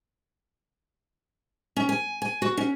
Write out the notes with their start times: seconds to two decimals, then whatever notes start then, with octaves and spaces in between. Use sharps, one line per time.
1.77 C#4
1.89 G#5
2.22 G#5
2.42 F#4
2.57 C#4